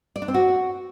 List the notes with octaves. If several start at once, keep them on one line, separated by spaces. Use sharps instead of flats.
D5
D4
C4
F#4